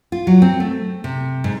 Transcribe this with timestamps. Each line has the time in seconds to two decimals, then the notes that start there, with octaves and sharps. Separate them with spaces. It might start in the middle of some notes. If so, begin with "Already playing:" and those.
0.12 F4
0.27 F#3
0.42 C4
0.60 A3
1.04 C3
1.44 G#2